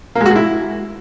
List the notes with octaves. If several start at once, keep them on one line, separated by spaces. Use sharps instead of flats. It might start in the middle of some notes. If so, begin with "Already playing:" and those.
A#3
G#3
F#4
G#3
E4